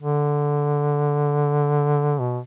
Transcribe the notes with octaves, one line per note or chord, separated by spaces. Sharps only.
D3
B2